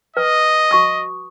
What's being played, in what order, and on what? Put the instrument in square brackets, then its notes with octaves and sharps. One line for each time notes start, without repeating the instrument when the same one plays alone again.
[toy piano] B4 [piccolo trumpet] D#5
[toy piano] F#4 C#6 D#6